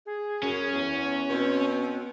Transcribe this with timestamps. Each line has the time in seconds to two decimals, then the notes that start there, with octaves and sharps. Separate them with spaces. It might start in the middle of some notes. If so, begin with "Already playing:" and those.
0.06 G#4
0.43 F#2 C#4
0.74 E2 C#5
1.30 B2 C4